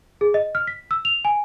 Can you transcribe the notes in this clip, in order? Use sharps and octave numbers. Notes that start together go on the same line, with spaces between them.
G#4
D#5
F6
B6
E6
F7
G#5